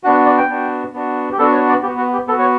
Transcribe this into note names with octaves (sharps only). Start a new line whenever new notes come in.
B3 D4 F#4 F#5
D5
G5
B3 D4 F#4
B3 D4 F#4
G4
B3 D4 F#4 A4
C#5
D5
B3 F#4 G4
F#4
G4
B3 F#4 A4
C#5